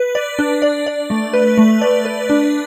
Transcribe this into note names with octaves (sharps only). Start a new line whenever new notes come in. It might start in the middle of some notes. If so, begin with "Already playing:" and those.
Already playing: B4
D5
D4
D5
D5
A3
B4
A3
D5
B4
D4